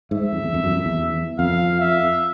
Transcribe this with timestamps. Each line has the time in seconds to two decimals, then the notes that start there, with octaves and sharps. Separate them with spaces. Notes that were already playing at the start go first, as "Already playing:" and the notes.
0.11 G#2 E5
0.32 F2
0.44 E2
0.54 F2
0.64 F#2
0.75 F2
0.85 E2
1.39 F2 F5
1.80 E5